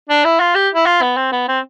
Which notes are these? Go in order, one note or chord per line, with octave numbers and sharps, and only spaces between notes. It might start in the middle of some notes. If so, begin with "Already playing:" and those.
D4
E4
F4
G4
E4
F4
B3
C4
B3
C4